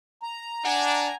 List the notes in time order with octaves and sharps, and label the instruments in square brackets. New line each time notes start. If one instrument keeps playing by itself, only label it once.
[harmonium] A#5
[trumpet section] D4 [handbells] F#5 [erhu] G#5